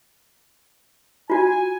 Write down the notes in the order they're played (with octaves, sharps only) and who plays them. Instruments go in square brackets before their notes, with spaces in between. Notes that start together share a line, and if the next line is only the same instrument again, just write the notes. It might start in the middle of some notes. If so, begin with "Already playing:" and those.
[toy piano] F4 F#4 [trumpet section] G#5